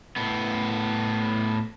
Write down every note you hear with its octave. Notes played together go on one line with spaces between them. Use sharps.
A2 B3